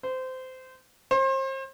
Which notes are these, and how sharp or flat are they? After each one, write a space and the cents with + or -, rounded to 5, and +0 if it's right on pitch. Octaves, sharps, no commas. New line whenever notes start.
C5 -20
C5 +35